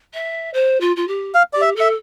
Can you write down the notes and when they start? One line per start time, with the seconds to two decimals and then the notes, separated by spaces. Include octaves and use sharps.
0.13 E5
0.53 C5
0.80 F4
0.96 F4
1.07 G4
1.35 F5
1.53 G4 D5
1.61 E5
1.76 A4 E5